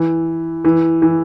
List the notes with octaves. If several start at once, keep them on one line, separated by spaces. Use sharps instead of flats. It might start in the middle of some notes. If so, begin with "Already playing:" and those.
Already playing: E3
E3
E3